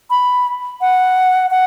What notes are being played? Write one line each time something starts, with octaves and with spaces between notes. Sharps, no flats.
B5
F#5
F#5